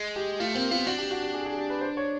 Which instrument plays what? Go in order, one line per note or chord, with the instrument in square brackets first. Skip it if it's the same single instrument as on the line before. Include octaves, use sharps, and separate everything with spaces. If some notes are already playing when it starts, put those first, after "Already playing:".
Already playing: [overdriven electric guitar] G#3
[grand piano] G4
[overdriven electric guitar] A3 [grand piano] F4
[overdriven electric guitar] A#3 [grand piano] C4
[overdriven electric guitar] B3 [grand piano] F4
[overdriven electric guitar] D4 [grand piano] F#4
[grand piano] G4
F#4
G4
G#4
G#4
G4
B4
C5
C#5